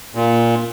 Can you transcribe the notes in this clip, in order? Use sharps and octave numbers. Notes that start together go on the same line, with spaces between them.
A#2